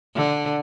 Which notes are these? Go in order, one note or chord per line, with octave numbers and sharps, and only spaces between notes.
D3